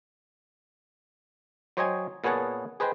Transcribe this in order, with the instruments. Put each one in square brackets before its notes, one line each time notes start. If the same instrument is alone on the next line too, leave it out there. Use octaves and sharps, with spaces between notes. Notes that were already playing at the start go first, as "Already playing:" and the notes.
[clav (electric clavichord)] F#3 C5 C#5 D#5 G5 G#5
A#2 B3 G#4 C#5 F#5 A5
G#4 B4 C5 D#5 G5